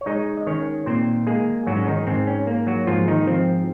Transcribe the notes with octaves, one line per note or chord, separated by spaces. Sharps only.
C#5
G#3 D#4 D#5
D#5
D#3 C#4 C#5
A#2 C4 C5
G#3 A#3 G#4
G#2 F#3 F#4
C#4
D#3 D#4
G#2 C4
C#4
A#3
F#3 F#4
G#2 F3 F4
D#3 D#4
F3 C4